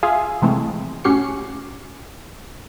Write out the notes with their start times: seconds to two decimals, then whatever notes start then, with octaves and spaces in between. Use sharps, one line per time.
0.03 F4 G#4 E5 F5 G#5
0.42 C3 E3 F3 G#3 A3 C4
1.04 A2 C#4 F#4 G4 C7 C#7